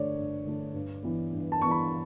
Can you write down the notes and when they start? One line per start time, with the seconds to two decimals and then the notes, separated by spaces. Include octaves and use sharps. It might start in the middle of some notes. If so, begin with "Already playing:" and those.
Already playing: G2 D3 A3 D4 C#5 D5
0.17 G2
0.45 D3 A3 D4
0.74 G2
1.03 E3 B3
1.33 G2
1.52 A5
1.61 B3 C#6
1.67 E3 B5